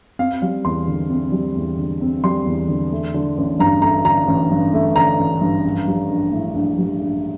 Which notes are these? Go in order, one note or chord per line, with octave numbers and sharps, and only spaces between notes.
C4 F5
G3 F5
E2 C6
D3
C4
G3
E2
D3
C4
G3 C6
E2
D3
A3
D3
A1
G2 A#5
A3 A#5
D3 A#5
A1
G2
A3
D3 A#5
A1
G2
A#1
G3
A#1
A2
A#1
G3
A#1